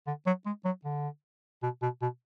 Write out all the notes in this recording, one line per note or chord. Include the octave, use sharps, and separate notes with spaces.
D3
F#3
G#3
F#3
D3
B2
B2
B2